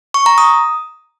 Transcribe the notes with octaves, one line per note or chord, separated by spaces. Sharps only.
C#6
A#5
D#6